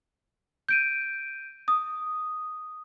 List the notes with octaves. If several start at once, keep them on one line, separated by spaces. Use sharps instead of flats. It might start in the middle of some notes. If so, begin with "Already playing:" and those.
G6 D7 D#7
D#6